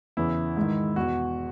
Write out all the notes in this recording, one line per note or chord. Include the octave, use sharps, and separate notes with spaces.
E2 C#3 E3 E4
G#2 D#3
E2 B2 F#4